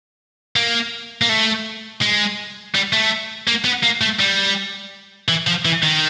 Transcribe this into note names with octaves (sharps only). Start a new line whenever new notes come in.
A#3
A#3
A3
G#3
G3
A3
A#3
B3
A#3
A3
G3
E3
F3
E3
D#3